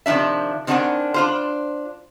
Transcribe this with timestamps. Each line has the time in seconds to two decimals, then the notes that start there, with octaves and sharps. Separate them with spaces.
0.06 C3 D#3 F3 D4 E5
0.67 D#3 C4 D4 F#4 F#5 G#5
1.14 D4 F4 C5